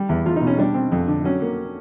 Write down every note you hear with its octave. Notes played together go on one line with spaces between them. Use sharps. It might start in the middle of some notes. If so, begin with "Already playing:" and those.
Already playing: G3
E2
E2 F4
D#4
B2
C#4
G3 D4
C4
F2
D3
F#3 C#4
A#3